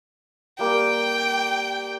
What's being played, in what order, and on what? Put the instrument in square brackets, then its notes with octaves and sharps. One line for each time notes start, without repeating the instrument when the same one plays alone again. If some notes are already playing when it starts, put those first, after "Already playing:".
[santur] G3 A#3 B5 [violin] G5